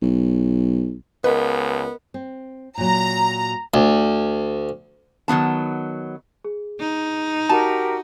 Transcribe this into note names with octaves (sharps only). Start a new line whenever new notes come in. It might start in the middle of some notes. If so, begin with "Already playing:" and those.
B1
C#2 B3 A#4 B4 D#5
C4
A#2 F#3 A#5
D2
D#3 F#3 B3 A5
G#4
D#4
F#4 G4 A#4 A5 A#5